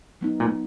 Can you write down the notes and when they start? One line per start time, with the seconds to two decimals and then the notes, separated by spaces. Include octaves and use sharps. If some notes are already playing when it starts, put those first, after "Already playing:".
0.21 F#3 B3 D#4
0.40 A#2